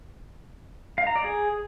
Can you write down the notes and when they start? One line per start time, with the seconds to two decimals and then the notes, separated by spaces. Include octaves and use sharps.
0.98 F5
1.07 A#5
1.16 D5
1.24 G#4